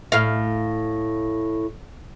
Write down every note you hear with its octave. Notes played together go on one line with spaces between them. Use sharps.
A2 F5